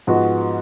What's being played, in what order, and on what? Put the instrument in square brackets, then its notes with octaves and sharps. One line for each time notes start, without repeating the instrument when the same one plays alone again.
[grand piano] G#2 F3 G#3 B3 F#4